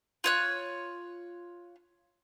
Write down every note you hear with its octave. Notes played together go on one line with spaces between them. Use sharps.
F4 C#5 F#6